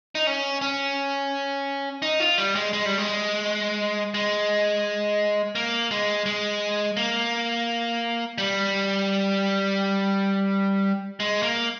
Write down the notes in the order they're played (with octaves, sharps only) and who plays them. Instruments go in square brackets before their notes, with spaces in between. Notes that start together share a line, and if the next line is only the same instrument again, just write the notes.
[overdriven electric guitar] D#4
C#4
C#4
D#4
F4
G3
G#3
G#3
G3
G#3
G#3
A#3
G#3
G#3
A#3
G3
G#3
A#3